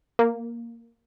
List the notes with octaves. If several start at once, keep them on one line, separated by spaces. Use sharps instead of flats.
A#3